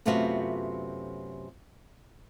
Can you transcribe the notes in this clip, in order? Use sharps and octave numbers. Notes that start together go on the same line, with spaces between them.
F#2 C3 A3 B3 F4 F#4